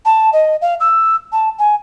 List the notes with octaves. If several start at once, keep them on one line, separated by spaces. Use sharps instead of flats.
A5
D#5
F5
E6
A5
G#5